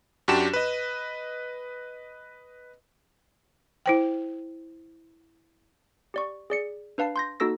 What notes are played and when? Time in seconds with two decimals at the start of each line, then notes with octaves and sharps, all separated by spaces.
0.28 F#2 D4 F#4 G4 A5 E7
0.53 B4 D#5
3.86 E4 C5 G5
6.14 G4 D5 C#6
6.50 G#4 D5 C#7
6.98 D4 B4 F5 A5 C7
7.16 C6 G6 A#6
7.40 A#3 D#4 F#4 A4 E6 A#6